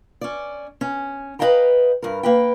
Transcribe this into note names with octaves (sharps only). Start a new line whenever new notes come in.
C#4 D5
C#4
B4 C#5 D#5 F5 G5 A#5
G2 A#4
A#3 B4 G5